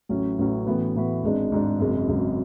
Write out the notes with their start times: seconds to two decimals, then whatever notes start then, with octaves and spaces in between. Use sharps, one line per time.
0.09 A1 A2 F#3 C#4
0.39 A1 A2 F#3 C#4
0.66 A2 E3 B3 F#4 B4
0.95 A2 E3 B3 F#4 B4
1.23 G#1 G#2 G#3 D4
1.51 G#1 G#2 G#3 D4
1.80 G#1 F#2 C#3 G#3
2.08 G#1 F#2 C#3 G#3